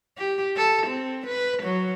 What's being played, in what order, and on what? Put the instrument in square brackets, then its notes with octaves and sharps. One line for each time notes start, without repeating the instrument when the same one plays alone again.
[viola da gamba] G4
A4
C4
B4
F#3